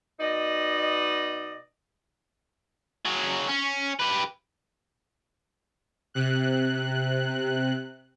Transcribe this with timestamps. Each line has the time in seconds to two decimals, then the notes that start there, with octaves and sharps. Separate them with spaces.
0.20 B2 D#4 D5 D#5
3.05 F#3 G#4
3.48 C#4
3.99 G4 B4
6.14 C3 F#6